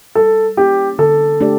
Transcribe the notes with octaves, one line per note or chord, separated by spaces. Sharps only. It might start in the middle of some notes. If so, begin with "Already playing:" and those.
G3 A4
A#3 C#4 E4 G4
D3 A4
A3 D4 G4 D5